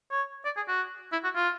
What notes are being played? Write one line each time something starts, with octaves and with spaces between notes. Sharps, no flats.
C#5
D5
G#4
F#4
E4
F#4
F4